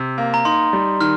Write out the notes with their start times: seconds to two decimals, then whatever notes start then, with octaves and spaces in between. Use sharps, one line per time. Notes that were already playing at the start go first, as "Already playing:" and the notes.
Already playing: C3
0.18 A#3
0.34 A#5
0.45 D#4 C6
0.73 G3
1.00 D#3 F6